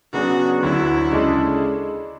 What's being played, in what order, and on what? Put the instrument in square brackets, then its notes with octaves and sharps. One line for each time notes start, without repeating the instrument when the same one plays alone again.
[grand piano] C#3 F#3 B3 D4 G#4 [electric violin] F#4
[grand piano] D2 D3 F#3 [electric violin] E4
[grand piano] C#3 G#3 D4 A4